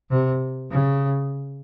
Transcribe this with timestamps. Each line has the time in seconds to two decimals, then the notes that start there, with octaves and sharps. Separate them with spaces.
0.10 C3
0.71 C#3